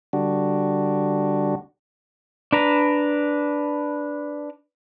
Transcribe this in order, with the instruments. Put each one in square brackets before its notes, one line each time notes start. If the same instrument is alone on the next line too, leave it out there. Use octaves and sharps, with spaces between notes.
[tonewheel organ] D3 G3 D4 F#4
[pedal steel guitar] D4 B4 A#5